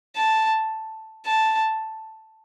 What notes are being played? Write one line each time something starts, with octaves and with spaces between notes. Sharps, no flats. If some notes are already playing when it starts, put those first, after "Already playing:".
A5
A5